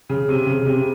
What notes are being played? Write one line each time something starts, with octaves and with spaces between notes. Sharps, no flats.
C#3
C3
C#3
C3